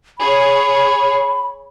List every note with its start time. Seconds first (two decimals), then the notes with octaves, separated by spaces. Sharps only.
0.19 G#4 C#5 B5